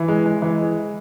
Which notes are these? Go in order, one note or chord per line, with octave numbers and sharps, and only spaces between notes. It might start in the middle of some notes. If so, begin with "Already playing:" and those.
Already playing: E3
G#3
G#3
E3